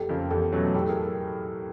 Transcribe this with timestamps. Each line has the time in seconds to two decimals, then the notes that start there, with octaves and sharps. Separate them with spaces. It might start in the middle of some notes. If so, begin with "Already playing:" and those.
Already playing: F1 G4 A4
0.09 F2 C#3 F3 A#3
0.30 E2 G4 A4
0.52 B2 F#3 A3 C#4
0.74 A2 G4 A4
0.89 G#4 A#4